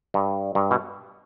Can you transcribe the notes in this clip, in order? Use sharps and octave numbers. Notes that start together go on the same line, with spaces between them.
G2
G2
B2